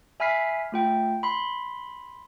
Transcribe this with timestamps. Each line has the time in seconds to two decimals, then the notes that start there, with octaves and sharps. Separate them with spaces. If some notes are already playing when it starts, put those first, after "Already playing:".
0.20 E5 G#5 B5 F6 B6 C7
0.72 A3 F4 G5
1.23 B5 C6